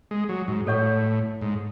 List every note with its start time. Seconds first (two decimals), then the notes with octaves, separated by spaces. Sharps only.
0.11 G#3
0.29 F#3
0.48 G#2
0.67 A2 A4 C#5 F#5 C#6
1.41 G#2